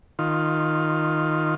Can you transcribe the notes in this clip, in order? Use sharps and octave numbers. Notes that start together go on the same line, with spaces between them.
D#3 F4